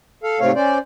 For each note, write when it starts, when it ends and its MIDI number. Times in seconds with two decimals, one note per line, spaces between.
0.23 0.40 69
0.23 0.40 77
0.40 0.52 44
0.40 0.52 48
0.40 0.52 57
0.40 0.52 60
0.40 0.52 73
0.40 0.52 77
0.55 0.78 61
0.55 0.78 72
0.55 0.78 74